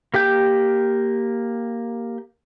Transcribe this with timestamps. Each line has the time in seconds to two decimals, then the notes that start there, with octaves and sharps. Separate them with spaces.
0.14 A#3 G4 G5 G6